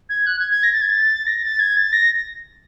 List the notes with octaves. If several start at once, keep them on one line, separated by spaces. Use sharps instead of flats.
G#6
F#6
G#6
G#6
A#6
A6
G#6
A6
A#6
A6
G#6
A6
A#6